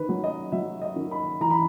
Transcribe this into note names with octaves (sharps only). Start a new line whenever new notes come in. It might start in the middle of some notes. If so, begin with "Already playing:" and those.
Already playing: D#3 B4
F#3
D#5
F#3 E5
D#5
D#3
B5
E3 A#5
B5